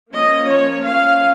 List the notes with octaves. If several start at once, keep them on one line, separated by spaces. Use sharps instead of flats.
F3 A#3 C#4 D#5
C#5
F3 A#3 C#4 F5